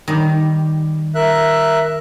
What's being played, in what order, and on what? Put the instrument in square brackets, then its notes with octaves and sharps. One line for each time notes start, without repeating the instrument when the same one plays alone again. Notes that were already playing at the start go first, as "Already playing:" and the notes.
[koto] D#3 G3
[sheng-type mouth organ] A#4 E5 F#6